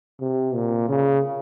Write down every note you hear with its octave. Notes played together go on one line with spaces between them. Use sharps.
C3
A#2
C#3